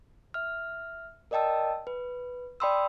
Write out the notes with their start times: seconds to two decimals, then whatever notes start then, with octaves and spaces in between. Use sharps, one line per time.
0.34 E5 F6
1.31 A#4 D5 D#5 G5 A5 E6
1.87 B4
2.60 D5 G5 B5 C6 D#6 E6